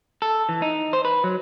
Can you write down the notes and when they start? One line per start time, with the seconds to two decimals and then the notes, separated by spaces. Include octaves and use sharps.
0.22 A4
0.49 E3
0.62 D#4
0.93 C5
1.05 B4
1.24 F#3